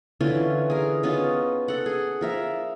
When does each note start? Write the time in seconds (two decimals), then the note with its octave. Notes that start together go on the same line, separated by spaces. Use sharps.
0.21 D3 E3 C#4 F4
0.70 G#4 A#4
1.03 B3 C#4 D#4 F4
1.68 A4 F#5
1.86 G#4
2.21 F3 A#4 E5